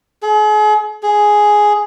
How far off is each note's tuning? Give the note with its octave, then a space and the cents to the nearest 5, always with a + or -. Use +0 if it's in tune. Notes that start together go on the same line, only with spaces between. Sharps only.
G#4 +40
G#4 +5